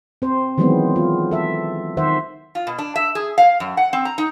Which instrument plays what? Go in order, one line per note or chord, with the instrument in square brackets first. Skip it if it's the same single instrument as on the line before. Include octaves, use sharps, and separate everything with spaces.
[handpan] C4 C5
D#3 E3 F#3 G#3 B3 C4
F4
A4 E5
D#3 C5 E5 F#5
[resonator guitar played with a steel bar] F4
B2
D4
E5
G#4
F5
F#2
F#5
C4
A#5
D#4